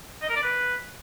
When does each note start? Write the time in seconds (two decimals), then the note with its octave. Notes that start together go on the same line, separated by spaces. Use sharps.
0.22 D#5
0.29 A#4
0.36 D5
0.43 B4